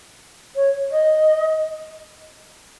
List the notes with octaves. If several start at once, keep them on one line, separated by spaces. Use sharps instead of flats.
C#5
D#5